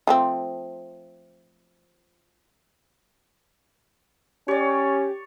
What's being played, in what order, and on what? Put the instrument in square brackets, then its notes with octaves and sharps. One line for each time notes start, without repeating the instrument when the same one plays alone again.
[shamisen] F3 A3 C4
[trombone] C#4 [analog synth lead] G4 [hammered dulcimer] C#5 D5